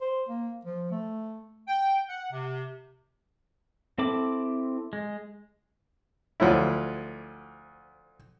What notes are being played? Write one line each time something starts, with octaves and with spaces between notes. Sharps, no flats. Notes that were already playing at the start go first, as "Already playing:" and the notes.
C5
A#3
F3
A3
G5
F#5
C3
C4 E4 A4 B5 D6
G#3
D2 F3 F#3 E4